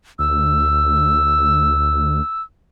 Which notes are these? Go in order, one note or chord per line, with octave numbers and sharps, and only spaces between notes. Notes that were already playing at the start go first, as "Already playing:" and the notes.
D2 E6